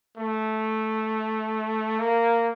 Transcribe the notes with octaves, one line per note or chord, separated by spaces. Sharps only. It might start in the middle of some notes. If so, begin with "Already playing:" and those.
A3
A#3